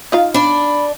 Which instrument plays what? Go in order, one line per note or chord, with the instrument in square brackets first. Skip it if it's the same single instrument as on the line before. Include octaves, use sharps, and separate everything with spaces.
[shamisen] D#4 F4 F5
[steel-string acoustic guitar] D4 D5 [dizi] B5